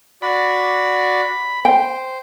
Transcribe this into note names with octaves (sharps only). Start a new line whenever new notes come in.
F#4 D5 B5
C5 G5